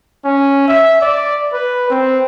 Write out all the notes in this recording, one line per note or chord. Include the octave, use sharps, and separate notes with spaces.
C#4
E5
D5
B4
C4